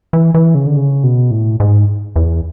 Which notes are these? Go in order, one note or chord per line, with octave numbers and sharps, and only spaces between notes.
E3
E3
C#3
D3
C#3
B2
A2
G#2
E2